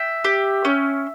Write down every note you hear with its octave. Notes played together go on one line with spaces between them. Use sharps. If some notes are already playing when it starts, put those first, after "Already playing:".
Already playing: E5 G5
G4
C#4